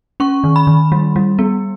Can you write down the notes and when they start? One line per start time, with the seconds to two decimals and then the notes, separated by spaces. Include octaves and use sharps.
0.20 C#4 C#6
0.44 D#3
0.56 B5
0.67 D#3
0.92 G3
1.16 G3
1.39 B3